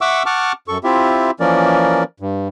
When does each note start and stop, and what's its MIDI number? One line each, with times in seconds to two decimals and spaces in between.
0.01 0.23 76
0.01 0.23 78
0.01 0.23 85
0.01 0.23 86
0.01 0.23 88
0.26 0.52 78
0.26 0.52 81
0.26 0.52 85
0.26 0.52 86
0.26 0.52 89
0.68 0.78 42
0.68 0.78 69
0.68 0.78 85
0.84 1.31 60
0.84 1.31 64
0.84 1.31 65
0.84 1.31 67
0.84 1.31 76
1.40 2.04 52
1.40 2.04 53
1.40 2.04 58
1.40 2.04 61
1.40 2.04 70
1.40 2.04 74
2.20 2.48 43